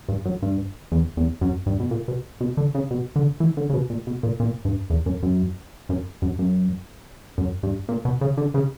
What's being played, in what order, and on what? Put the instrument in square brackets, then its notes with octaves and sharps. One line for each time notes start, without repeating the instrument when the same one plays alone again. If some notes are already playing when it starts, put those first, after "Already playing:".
[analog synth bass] G2
F#2
G2
E2
E2
F#2
G2
B2
A#2
B2
B2
D3
C#3
B2
D3
E3
D3
C#3
B2
A#2
B2
A#2
A#2
G2
E2
F#2
F#2
F#2
F#2
F#2
F#2
G2
A#2
B2
C#3
D3
C#3